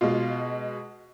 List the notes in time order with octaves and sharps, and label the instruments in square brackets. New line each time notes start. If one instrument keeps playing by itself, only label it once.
[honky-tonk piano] B2 G#3 F4